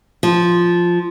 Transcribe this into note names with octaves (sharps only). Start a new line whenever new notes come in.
F3